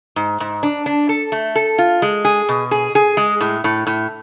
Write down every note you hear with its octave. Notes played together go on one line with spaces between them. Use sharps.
G#2
G#2
D4
D4
A4
A3
A4
F4
G#3
G#4
B2
G#4
G#4
G#3
A2
A2
A2